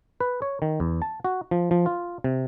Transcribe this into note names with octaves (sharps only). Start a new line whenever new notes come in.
B4
C#5
D#3
E2
A5
F#4
F3
F3
F4
C3